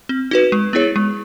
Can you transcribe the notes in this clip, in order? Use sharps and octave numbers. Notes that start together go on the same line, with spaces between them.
C4
D#4 F#4 B4
G#3
B3 E4 G#4 C#5
G#3